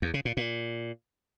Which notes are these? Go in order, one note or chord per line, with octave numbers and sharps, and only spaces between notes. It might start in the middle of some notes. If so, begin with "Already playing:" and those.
E2
C#3
A#2
A#2